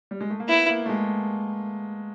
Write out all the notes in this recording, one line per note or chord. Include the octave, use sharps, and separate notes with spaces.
G3
G#3
A3
A#3
B3 E4
A#3
A3
G#3